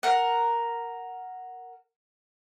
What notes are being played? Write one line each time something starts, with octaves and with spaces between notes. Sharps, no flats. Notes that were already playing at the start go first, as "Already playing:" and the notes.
A#4 F#5